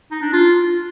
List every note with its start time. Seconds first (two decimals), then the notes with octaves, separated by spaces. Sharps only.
0.11 D#4
0.22 D4
0.33 F4